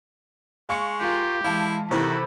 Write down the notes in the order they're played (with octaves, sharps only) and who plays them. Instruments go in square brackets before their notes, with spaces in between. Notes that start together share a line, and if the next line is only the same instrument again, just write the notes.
[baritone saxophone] G#3 [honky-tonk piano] F5 C#6 C#7
[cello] F4 A#4 [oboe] G4
[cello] E3 G#3 [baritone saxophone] E4 [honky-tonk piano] F5 A5
[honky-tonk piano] C3 E3 B5 [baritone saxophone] D#3 [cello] E4 A4 [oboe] F#4